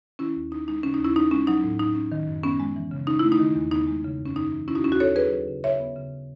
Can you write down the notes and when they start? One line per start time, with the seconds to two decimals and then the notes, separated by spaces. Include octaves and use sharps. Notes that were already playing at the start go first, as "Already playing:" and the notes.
0.19 D#3 C#4 E4
0.36 D#2
0.51 C#4 D#4
0.67 G#3 D#4
0.83 C#3 C#4
0.94 D#4
0.99 D#2
1.04 C#4 E4
1.16 C#4 D#4
1.31 G#3 C#4
1.47 F#3 D#4
1.64 A2
1.79 A2 D#4
1.95 C#4
2.12 D#3
2.28 F#2
2.43 B3 C#4
2.60 G#3
2.76 E3
2.91 C#3
3.07 C#4 D#4
3.19 A3 E4
3.32 D#4
3.39 D#3
3.55 E2
3.71 B3 D#4
3.87 G#3
4.04 C#3
4.20 F#2
4.26 C#4
4.36 F#2 D#4
4.52 E3
4.67 D#3 C#4 E4
4.75 D#4 F#4
4.83 D#2 C#4 E4
4.92 D#4 F#4
5.00 D#2 A4 C#5
5.16 F#3 G#4 B4
5.32 F#3
5.48 C#3
5.63 C#3 C#5 E5
5.80 B3
5.96 C#3